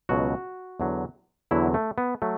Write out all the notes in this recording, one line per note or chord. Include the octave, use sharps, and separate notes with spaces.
C#2 B2 F#3 F#4
E2 D3 F#3
E2 D3 F#3 E4
A3
B3
F#3 A3